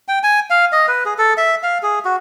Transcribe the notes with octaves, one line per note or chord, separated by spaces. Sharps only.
G5
G#5
F5
D#5
B4
G#4
A4
E5
F5
G#4
F#4